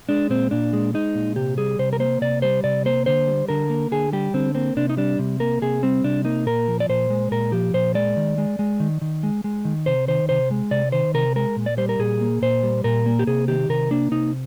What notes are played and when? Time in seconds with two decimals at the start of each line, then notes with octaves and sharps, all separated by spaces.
0.09 G#3 D4
0.30 A#2 C4
0.51 A#2 D4
0.73 G#3
0.94 G#3 D#4
1.15 A#2
1.36 C3 G4
1.58 G3 G#4
1.79 C3 C5
1.93 A#4
2.00 A#3 C5
2.21 C3 D5
2.42 G3 C5
2.64 C3 D5
2.85 A#3 C5
3.06 D3 C5
3.27 G3
3.49 D3 A#4
3.70 A#3
3.92 D3 G#4
4.13 G3 G4
4.34 D3 C4
4.55 A#3 C4
4.77 C3 D4
4.90 D#4
4.97 G3 D4
5.19 C3
5.40 A#3 A#4
5.62 C3 G#4
5.83 G3 C4
6.04 C3 D4
6.25 A#3 D#4
6.46 A#2 A#4
6.68 F3
6.80 D5
6.89 A#2 C5
7.10 G#3
7.31 A#2 A#4
7.52 F3 G4
7.74 A#2 C5
7.95 G#3 D5
8.17 D#3
8.38 G#3
8.59 G#3
8.80 D#3
9.01 D#3
9.23 G#3
9.44 G#3
9.65 D#3
9.86 C3 C5
10.08 D#3 C5
10.29 C3 C5
10.51 G#3
10.71 C3 D5
10.92 D#3 C5
11.14 C3 A#4
11.36 G#3 A#4
11.56 A#2
11.66 D5
11.78 G3 C5
11.89 A#4
11.99 A#2 G#4
12.21 A#3
12.42 A#2 C5
12.63 G3
12.84 A#2 A#4
13.06 A#3
13.19 G4
13.27 C3 G#4
13.48 D#3 G4
13.69 C3 A#4
13.91 A#3 D4
14.11 C3 D#4